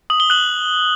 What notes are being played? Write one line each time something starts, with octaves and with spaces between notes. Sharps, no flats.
D#6 F#7
G7
F#6 F#7